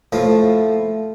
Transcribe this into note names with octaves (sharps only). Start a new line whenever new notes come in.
A2 F3